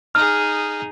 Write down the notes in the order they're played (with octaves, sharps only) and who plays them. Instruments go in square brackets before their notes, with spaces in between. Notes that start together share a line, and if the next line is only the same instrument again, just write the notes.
[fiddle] D#4 G#4 [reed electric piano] F6